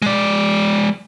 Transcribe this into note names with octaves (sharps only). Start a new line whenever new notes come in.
G#3 D5